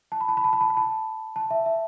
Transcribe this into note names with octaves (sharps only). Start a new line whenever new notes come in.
A5
B5
A5
B5
A5
B5
A5
B5
A5
A5
E5
E5